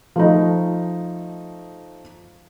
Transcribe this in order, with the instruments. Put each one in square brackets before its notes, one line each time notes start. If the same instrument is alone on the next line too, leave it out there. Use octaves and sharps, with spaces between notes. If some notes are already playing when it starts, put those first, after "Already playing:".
[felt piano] F3 A3 D#4